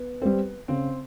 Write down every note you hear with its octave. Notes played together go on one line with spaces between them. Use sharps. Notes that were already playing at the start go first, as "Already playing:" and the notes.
Already playing: B3
G3 C4
C#3 C4